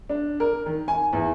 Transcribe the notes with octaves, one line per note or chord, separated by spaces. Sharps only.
D4
A#4
D#3
G#5
E2